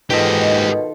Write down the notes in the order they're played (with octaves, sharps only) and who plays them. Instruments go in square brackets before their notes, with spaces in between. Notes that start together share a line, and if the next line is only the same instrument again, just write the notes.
[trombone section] G#2 [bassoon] B2 [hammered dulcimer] D#3 F4 A4 [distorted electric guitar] G4 D#5